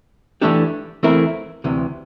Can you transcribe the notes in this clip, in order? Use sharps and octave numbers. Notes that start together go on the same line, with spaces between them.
E3 A3 D4 G4
E3 A3 C4 E4 A#4
D2 C3 E3